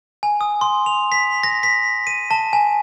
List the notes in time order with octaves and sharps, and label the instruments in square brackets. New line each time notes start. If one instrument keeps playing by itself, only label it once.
[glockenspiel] G#5
D#6
C6
F7
B6
A#6
B6
D#7
A5
G#5